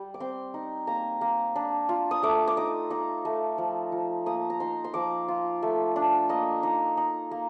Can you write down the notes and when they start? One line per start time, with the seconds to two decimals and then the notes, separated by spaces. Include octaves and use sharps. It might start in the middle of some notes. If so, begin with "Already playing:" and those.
Already playing: G3
0.14 D6
0.20 C4 C6
0.54 D#4
0.87 A#3 A#5
1.21 A#3
1.56 D4
1.89 F4
2.11 D#6
2.23 A3 D6
2.47 D6
2.57 D#4 D#6
2.90 D#4 D6
3.25 A3
3.58 F3
3.92 F3
4.26 A#3 D#6
4.50 A#5
4.60 D#4 C6
4.84 C6
4.94 F3 D6
5.28 F4
5.62 A3
5.96 D4
6.29 A#3 D#5
6.63 D#4
6.97 D#4
7.31 A#3